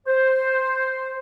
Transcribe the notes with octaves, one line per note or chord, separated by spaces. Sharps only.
C5